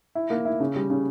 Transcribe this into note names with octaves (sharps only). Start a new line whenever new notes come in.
E4
A#3
E4
C#3
G3
C#3